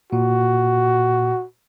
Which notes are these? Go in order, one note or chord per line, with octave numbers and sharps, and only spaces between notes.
A#2 F#4